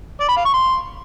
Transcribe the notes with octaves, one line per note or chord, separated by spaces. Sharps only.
D5
B5
F5
C#6
C6